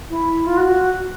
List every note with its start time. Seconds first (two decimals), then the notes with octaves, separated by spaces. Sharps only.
0.09 E4
0.46 F4
0.57 F#4